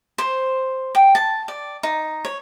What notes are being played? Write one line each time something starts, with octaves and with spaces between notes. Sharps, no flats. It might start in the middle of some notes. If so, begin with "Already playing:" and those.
C5
G5
A5
D5
D#4
C#5